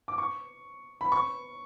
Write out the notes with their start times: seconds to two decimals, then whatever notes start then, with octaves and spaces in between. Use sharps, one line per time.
0.08 D6
0.18 C#6
1.01 B5
1.12 C#6